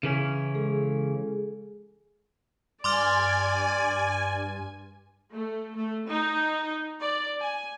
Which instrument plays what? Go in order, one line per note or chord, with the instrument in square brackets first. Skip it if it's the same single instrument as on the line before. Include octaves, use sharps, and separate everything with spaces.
[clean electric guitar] C#3 E3 C#4
[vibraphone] G#3 G#4 A4
[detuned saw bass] G2 [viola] D5 [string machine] G#5 [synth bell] C6 D6 F6
[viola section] A3
A3
D#4
D5
G#5